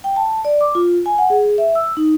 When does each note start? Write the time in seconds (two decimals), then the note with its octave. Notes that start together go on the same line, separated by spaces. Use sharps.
0.04 G5
0.16 A5
0.45 D5
0.61 D6
0.75 F4
1.06 G#5
1.18 F#5
1.30 G#4
1.58 E5
1.75 E6
1.97 D#4